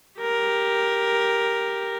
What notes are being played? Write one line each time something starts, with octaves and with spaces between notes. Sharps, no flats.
G4 A#4